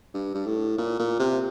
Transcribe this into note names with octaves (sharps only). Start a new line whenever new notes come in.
G2
G2
A2
A#2
A#2
C3